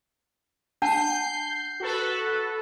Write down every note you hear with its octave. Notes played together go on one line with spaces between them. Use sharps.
D4 F#5 A5 G6 C7
F#4 A4 B4